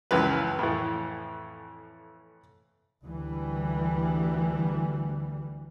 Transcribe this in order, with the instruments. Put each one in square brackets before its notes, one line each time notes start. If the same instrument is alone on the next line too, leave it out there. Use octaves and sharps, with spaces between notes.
[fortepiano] C#2 F#2 E3 F3 B4
F2 A2 E3
[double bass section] D2 E3 G3